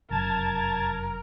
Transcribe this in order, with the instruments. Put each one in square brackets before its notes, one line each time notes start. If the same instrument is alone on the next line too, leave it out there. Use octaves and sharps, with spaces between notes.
[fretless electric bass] F1 F#2 C#3 [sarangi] A#4 [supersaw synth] A5 G#6 A6